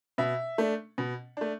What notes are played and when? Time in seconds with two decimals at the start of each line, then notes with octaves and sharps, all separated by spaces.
0.18 B2 E5
0.58 A3 D4
0.98 B2
1.37 A3 D4